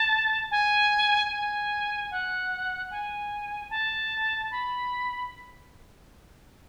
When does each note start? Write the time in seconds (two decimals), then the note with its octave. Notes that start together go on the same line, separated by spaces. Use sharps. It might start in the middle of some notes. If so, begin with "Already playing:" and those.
Already playing: A5
0.51 G#5
1.32 G#5
2.11 F#5
2.91 G#5
3.70 A5
4.51 B5